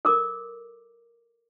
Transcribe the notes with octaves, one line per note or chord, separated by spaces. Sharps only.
A4 A#4 D6